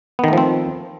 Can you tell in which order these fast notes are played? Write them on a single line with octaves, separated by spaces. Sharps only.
B3 D#3 A3 F3 C4